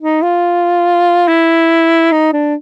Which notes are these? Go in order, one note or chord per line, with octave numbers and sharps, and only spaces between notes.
D#4
F4
E4
D#4
D4